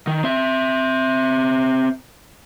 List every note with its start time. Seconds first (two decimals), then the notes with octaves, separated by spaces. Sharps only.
0.07 D#3
0.24 C4 E5